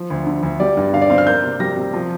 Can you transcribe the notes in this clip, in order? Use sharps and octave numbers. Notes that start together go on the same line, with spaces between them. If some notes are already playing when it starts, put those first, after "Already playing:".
Already playing: F3
D2
D3
D2
G3 D5
G2
D3 F5
D5
C4 F5
F6
A#3 G6
C3
G3 A#6
C3
F3